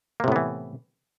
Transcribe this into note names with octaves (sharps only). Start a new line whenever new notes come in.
A2 C3 E3 A#3 B3